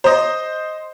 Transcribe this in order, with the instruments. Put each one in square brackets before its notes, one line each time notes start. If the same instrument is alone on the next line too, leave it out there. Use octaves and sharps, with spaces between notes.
[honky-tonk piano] C5 D#5